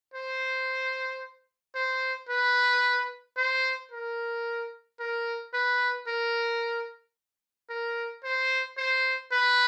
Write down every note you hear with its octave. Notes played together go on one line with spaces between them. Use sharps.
C5
C5
B4
C5
A#4
A#4
B4
A#4
A#4
C5
C5
B4